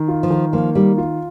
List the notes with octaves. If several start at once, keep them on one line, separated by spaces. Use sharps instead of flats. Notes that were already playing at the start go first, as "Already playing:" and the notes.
Already playing: D#3
F4
F3
D#3
F3 A#3
D#3 G3
F4